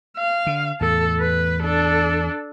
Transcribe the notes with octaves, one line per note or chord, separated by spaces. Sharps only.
F5
D3
E2 A2 A4
B4
D4 A4